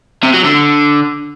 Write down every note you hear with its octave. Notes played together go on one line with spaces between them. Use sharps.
C3
F#3
D3